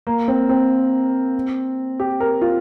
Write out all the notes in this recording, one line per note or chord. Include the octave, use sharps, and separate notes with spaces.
A#3
C4
C4
G4
A#4
F4